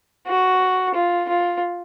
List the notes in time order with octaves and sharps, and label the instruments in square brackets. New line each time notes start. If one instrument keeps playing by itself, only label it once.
[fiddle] F#4
F4
F4